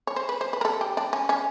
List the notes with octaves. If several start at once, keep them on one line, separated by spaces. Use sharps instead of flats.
C#5
C5
B4
C5
B4
A#4
A4
G4
D4
C#4
C#4